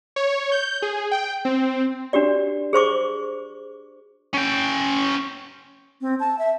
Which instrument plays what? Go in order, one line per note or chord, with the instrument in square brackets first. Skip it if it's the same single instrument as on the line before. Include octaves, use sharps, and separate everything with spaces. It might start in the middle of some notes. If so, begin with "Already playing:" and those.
[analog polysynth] C#5
G6
G#4
G5
C4
[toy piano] D4 F#4 G4 D5
G#4 C5 C#6 D6
[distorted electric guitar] C#4 G5
[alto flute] C4
A5
E5